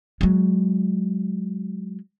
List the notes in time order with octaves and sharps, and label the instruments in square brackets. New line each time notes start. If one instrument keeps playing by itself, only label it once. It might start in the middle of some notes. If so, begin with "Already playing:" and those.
[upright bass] F#3 G#3